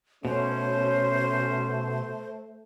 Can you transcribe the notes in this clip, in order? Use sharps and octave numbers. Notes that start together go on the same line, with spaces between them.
B2 A3 C#4 C5